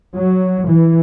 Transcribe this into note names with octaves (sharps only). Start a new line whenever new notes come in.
F#3
E3